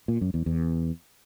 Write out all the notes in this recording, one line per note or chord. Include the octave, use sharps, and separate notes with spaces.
A#2
F#2
E2
E2